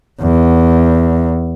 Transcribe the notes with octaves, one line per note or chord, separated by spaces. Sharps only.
E2